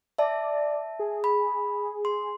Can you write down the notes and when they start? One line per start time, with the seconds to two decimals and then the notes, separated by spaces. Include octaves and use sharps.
0.18 D5 E5 A5
0.99 G#4
1.24 B5
2.05 C6